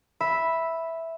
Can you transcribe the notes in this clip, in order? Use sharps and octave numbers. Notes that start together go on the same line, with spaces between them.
E5 B5